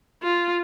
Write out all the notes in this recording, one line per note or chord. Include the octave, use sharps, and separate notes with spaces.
F4